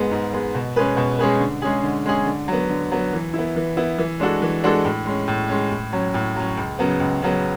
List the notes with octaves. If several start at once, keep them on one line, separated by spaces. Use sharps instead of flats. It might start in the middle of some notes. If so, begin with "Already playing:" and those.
Already playing: G#2 G#3 B3
G#2
G#3 B3
B2
G#3 C#4 G#4 B4
B2
G#3 C#4 G#4 B4
D3
G#3 C#4 G#4
D3
G#3 C#4 G#4
D3
F#3 B3
D3
F#3 B3
E3
B3 E4
E3
B3 E4
E3
G#3 D4 F#4 A4
E3
G#3 D4 F#4 A4
A2
G#3 C#4
A2
G#3 C#4
A2
F#3 C#4
A2
F#3 C#4
C#2
C#3 F#3 B3
C#2
C#3 F#3 B3